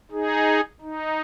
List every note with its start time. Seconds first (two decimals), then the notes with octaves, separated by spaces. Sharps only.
0.12 D#4 G#4
0.82 D#4